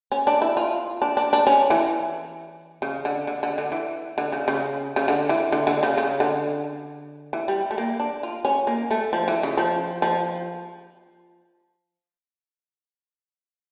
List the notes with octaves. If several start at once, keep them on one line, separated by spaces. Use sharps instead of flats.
C#4
D4
E4
F4
D4
D4
D4
C#4
E3
C#3
D3
D3
D3
D3
E3
D3
C#3
C#3
C#3
D3
E3
D3
D3
C#3
C#3
D3
E3
G3
A3
A#3
D4
F4
C#4
A#3
A3
F3
E3
C#3
F3
F3